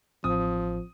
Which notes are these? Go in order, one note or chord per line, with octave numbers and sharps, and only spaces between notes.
A1 F3 C4 D#6